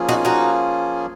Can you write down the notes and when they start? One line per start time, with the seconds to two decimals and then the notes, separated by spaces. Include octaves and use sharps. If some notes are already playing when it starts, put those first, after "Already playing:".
Already playing: F3 A#3 C#4 F4 G#4
0.09 D#4 F#4
0.25 D#4 F#4